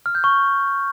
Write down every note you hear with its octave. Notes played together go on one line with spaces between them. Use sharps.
F6
G6
C#6